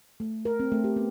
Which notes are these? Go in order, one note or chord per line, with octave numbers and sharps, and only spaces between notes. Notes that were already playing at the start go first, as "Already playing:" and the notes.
A3
A#4
C4
A3
G4
B3